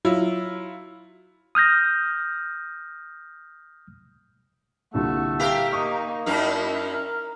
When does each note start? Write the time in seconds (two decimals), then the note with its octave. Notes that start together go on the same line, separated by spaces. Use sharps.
0.05 F#3 E4 F4
1.55 D#6 F6 G6 A#6
4.94 C2 A#2 D3 A3 F#4
5.40 G4 A#4 E5 F5
5.72 A#3 D#4 C#6 D#6
6.26 F#2 A#3 D#4 E4 A#4